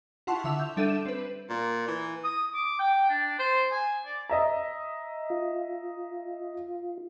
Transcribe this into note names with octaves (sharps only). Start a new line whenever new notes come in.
E4 F4 F#5 A5 C6 C#6
D3 E5 E6 F7
G6
G3 D4 A4 E5 G6 D#7
E7
C4 B4
A#2
E3
D#6
D6
G5
D4
C5
G#5
D5
D#5 E5 A#5
F4